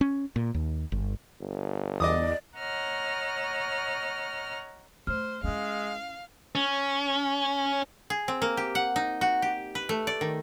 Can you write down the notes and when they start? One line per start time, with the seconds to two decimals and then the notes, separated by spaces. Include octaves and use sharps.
0.01 C#4
0.36 A#2
0.54 D#2
0.92 G1
1.40 G1
2.00 E2 D5 D#5 D6 D#6
2.58 C#5 D#5 F#5 A#5 F6
5.07 A3 C5 F6
5.44 G#3 C#4 E4 F5
6.55 C#4
8.10 G#4
8.28 C4
8.42 A#3
8.57 G4
8.75 F#5
8.96 D#4
9.21 F#4
9.42 G4
9.75 B4
9.89 A3
10.07 D5
10.21 D#3